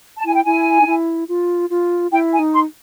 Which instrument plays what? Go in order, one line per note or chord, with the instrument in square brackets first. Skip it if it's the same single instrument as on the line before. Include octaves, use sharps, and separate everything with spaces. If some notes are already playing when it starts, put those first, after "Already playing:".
[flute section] A5
[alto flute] E4 [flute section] G#5
[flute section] G5
[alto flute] E4 [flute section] G#5
[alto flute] D#4
E4
F4
F4
[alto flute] E4 [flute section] G5
[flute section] G#5
[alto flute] D#4
[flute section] C6